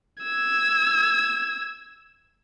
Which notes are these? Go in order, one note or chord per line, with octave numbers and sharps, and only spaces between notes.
E6 G#6